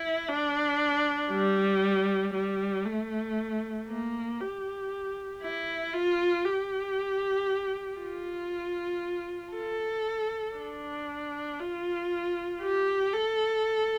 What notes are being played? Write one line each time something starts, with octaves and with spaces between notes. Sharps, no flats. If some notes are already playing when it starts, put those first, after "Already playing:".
Already playing: E4
D4
G3
G3
A3
A#3
G4
E4
F4
G4
F4
A4
D4
F4
G4
A4